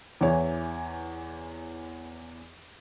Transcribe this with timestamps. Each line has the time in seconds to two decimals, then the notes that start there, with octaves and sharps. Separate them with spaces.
0.21 E2 E3 C#5